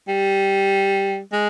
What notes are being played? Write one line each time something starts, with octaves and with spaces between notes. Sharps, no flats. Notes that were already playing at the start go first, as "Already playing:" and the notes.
G3
G#3